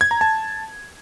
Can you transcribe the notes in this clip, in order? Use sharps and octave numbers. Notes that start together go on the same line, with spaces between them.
G#6
A#5
A5